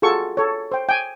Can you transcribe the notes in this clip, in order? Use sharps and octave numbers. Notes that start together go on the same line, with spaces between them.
F4 F#4 G#4 A4 C#6
A4 C#5
C5 G5
G5 G#5